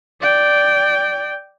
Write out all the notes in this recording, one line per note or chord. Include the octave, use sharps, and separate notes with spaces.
D5 G5